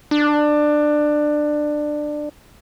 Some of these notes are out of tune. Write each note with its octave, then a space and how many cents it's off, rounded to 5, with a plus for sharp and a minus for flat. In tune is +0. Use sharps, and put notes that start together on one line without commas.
D4 +20